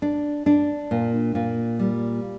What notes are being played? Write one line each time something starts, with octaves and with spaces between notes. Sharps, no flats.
D4
D4
A#2
A#2
G3